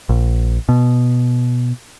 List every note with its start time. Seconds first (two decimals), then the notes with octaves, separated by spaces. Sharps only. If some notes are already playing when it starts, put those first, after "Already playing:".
0.09 A#1
0.69 B2